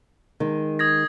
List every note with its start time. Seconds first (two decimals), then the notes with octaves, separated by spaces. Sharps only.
0.40 D#3 G#3
0.79 D#6 G#6 A#6